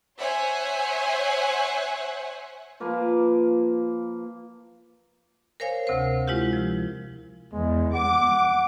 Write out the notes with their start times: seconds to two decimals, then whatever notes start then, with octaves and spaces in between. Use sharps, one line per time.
0.19 C5 C#5 E5 F#5 G#5
2.80 F3 A#3 B4 F5
5.60 A#4 C5 C#5 F5 G#5
5.87 D2 C3 C4 A#4 C5
6.28 G#3 E4 F4 G4
6.53 F3
7.53 E2 G#3
7.95 F#5 D6